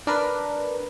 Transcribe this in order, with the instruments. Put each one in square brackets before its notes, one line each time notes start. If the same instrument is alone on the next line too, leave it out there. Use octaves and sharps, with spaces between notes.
[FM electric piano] D4 A#4 B4